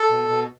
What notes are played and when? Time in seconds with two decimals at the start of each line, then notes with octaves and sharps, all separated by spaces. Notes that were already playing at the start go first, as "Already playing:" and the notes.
Already playing: A4
0.10 B2
0.28 B2